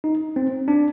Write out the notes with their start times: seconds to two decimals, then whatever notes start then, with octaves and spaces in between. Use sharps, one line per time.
0.04 D#4
0.36 C4
0.68 D4